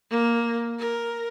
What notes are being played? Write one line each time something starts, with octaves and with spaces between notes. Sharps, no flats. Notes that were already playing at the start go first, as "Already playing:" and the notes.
A#3
A#4